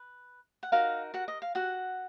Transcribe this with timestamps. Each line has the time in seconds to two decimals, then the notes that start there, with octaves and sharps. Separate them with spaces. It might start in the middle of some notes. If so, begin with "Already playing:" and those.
Already playing: B4
0.63 F#5
0.72 D#4 F#4 A#4 F5
1.14 F#4 F#5
1.28 D#5
1.42 F5
1.55 F#4 F#5